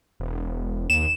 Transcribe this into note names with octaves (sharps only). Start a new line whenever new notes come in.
E1
D#2 E7